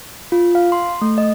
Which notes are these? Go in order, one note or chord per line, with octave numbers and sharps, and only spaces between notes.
F4
F5
C6
A3
D#5